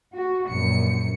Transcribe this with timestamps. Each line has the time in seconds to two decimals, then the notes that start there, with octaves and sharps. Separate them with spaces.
0.13 F#4
0.49 A#1 F#2 C#7